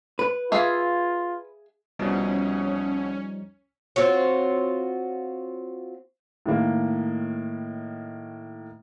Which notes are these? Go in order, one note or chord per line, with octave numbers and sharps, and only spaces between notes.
B4
F4 G#4 E5 F5
C2 B2 F3 G3 C#4 D#4
C4 F4 F#4 C#5
A2 D#3 A#3